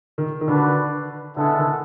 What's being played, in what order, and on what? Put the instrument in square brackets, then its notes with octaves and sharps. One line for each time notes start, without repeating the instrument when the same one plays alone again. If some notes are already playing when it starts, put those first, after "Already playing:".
[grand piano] D#3
D#3
[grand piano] D3 [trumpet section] D4 F#4 B4
[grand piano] D3 [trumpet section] G#3 B3 E4 A4
[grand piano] D#3